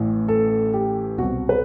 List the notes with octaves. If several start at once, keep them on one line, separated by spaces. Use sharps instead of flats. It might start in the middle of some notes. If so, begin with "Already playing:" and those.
Already playing: A1 A2 E3
A4
G4
C2 B2 F#4
B4